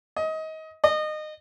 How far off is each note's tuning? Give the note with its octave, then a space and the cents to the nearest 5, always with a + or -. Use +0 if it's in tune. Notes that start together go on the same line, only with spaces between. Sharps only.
D#5 +25
D#5 -25